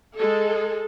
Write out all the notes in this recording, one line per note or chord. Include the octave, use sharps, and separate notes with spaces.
G#3 A4